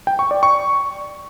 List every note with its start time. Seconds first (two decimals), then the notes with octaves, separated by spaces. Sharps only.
0.07 G5
0.19 C#6
0.31 D5
0.43 C#6